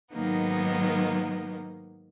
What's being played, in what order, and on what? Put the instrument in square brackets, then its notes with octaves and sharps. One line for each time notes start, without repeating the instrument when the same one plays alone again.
[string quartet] G#2 D#3 F#3 A#3 B3 D#4